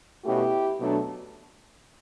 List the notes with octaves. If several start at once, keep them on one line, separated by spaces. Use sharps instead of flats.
B2 A3 C#4 E4 G4
B2 F#3 A3 D4